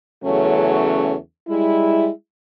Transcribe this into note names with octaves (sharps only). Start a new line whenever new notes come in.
E2 C#3 F#3 A3 C#4
G3 G#3 E4